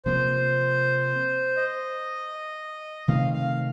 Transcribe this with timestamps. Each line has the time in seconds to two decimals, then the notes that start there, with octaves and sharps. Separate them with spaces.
0.05 C3 F3 A#3 C5
1.57 D#5
3.08 C3 D#3 A3 C4 F5
3.34 F5